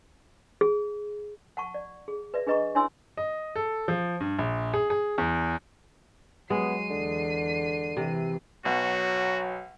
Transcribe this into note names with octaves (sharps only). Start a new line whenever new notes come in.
G#4
F#5 A5 C#6
D5
G#4
B4 D5 E5
D4 G#4 B4 D#5 A#5 C#6
D4 E4 C#5 G#5 C6 E6
D#5
A4
F3
G2
A#1
G#4
G#4
E2
F#3 G#3 B3 C7 D#7
E2 D3
C3 E3
B1 F#3 F#4